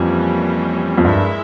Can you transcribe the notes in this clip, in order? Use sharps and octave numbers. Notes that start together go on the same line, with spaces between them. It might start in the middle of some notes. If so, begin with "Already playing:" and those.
Already playing: F2 E3 G3 A#3 C#4
F2
G2 G#3 E4 A#4 E5